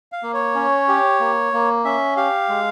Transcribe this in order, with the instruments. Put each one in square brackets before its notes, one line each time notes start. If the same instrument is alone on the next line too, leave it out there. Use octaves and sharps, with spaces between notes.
[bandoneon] F5
[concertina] A#3
[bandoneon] C#5
[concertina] C#4
G4
A#3
A#3
[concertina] C#4 [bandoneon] E5
[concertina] G4 [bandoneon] F5
[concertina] G#3